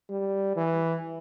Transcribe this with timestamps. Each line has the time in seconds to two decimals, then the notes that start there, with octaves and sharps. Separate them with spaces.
0.10 G3
0.56 E3